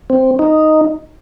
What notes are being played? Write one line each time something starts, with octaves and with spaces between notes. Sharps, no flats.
C4
D#4